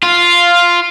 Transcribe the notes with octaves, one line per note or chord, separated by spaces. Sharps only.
F4